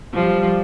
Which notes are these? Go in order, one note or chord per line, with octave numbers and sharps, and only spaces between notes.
F3 G3